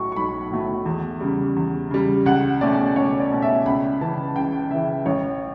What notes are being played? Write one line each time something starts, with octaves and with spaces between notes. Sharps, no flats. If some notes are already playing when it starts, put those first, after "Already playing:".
Already playing: B1 A2 F#3 A3 C#6
C#6
B1 B5
A2 F#3 A3
E2
C#3 G3
E2
C#3 G3
C#2 F#5
B2 A3 C#4 D5
C#2 C#5
D5
B2 A3 C#4
E5
C#2 B5
C#3 E3 A5
C#2 G5
C#3 E3 E5
A1 C#5